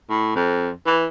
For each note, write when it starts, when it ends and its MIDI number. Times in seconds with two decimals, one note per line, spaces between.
0.10 0.33 45
0.35 0.70 41
0.86 1.07 52